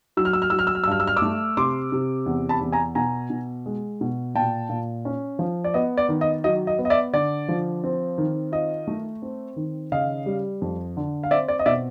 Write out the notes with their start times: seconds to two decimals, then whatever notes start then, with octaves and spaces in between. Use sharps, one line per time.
0.17 F#3 E6
0.25 F6
0.33 E6
0.42 F6
0.50 F#3 E6
0.59 F6
0.67 E6
0.75 F6
0.84 E6
0.87 G2 F6
1.00 E6
1.07 F6
1.17 D6 E6
1.22 A3
1.57 C3 C6 D6
1.92 C3
2.26 E2
2.49 A5 B5
2.61 E2
2.72 G#5 A#5
2.95 B2 G#5 A#5
3.30 B2
3.66 G#3
4.01 B2
4.35 A#2 G5 A5
4.69 A#2
5.05 C#4
5.39 F3
5.64 D5
5.74 B3 D#5
5.97 D5
6.09 D#3
6.21 D#5
6.44 F#3 D#5
6.67 D#5
6.79 B3
6.85 D#5
6.90 D5 E5
7.13 D3 D5
7.49 F3
7.84 C4
8.18 D#3
8.52 F4 D#5
8.87 A3
9.22 C4
9.56 D#3
9.92 C#3 D#5 F5
10.26 G3
10.62 F2
10.97 D3
11.23 F5
11.31 C4 D5 E5
11.48 D5
11.59 D#5
11.66 B2 D5 E5